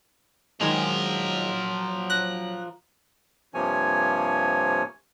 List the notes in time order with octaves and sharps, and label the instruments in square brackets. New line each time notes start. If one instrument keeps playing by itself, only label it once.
[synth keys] D#3 G#3 [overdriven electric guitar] F3 A#4 [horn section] F#3
[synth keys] F#6 A#6
[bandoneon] G2 C3 F3 A#3 C#5 G#5